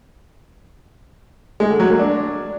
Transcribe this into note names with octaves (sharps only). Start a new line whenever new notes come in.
G#3
D3
F#3
A#3
D4